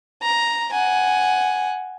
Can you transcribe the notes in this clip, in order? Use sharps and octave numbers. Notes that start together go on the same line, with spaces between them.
A#5
F#5 G#5